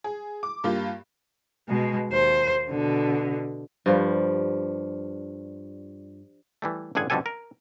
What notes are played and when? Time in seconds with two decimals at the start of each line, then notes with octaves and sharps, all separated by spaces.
0.04 G#4
0.43 D6
0.64 G2 A#3 F4 G4
1.68 B2 G#3
2.10 D#2 C5
2.70 B2 D3
3.86 G2 F3 G3
6.62 E3 G3 A3
6.95 A1 G2 D3 G#4 F#5 G#5
7.10 F2 B2 D3 G3 A4 G#5
7.26 A#4